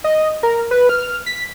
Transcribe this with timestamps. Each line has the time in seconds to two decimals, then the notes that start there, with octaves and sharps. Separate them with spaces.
0.04 D#5
0.43 A#4
0.71 B4
0.89 F6
1.26 B6